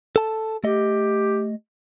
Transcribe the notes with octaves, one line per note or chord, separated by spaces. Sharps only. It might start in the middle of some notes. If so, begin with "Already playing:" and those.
A4 A5
A3 G4 D#5